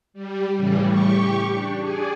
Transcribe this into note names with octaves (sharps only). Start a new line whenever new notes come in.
G3
A2 C#3 E3 G3
G4 C#6
D4
G#4 D5 G#5